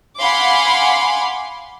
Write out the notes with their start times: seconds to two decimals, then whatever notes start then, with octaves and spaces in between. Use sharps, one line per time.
0.20 F5 F#5 G#5 B5 C6 D6